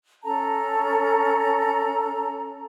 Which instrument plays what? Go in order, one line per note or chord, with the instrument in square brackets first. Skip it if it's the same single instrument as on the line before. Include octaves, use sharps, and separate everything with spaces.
[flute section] C#4 A4 A5 A#5